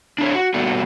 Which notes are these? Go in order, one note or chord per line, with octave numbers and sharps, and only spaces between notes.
D4 E4 G#4 C#5
F#4
A#2 G3 A3 B3 F#4